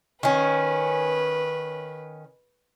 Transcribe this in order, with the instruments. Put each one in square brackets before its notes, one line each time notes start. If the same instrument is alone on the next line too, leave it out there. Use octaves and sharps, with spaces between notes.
[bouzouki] D#3 C#4 [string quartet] B4